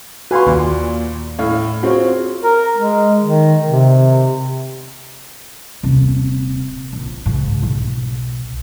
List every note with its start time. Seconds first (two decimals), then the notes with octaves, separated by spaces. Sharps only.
0.31 F#4 B4 F5 G#5 C6
0.46 D#2 A#2
1.39 A2 F5
1.83 C4 F4 F#4 G#4 C#5
2.43 A#4
2.77 G#3
3.23 D#3
3.65 C3
5.83 D#1 C3
6.93 A#1
7.26 C#2 G#2
7.63 B1